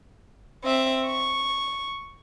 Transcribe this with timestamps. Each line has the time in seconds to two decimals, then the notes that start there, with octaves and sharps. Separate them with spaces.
0.65 C4 E5
1.06 C#6